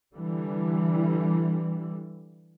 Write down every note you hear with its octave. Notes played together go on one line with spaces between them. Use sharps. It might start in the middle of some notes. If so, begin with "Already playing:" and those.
D3 E3 G3